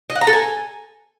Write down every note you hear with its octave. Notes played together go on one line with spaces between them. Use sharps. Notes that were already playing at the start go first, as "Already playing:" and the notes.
D#5
F#5
A#5
A4
G#5